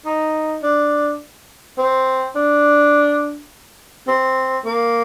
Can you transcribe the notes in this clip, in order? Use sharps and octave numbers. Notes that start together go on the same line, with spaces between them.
D#4
D4
C4
D4
C4
A#3